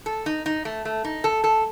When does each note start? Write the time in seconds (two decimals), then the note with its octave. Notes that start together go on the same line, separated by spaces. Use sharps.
0.06 A4
0.26 D#4
0.46 D#4
0.65 A3
0.85 A3
1.05 D#4
1.24 A4
1.44 A4